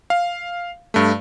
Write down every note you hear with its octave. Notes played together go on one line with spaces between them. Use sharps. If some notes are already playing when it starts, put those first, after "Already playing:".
F5
G2 A3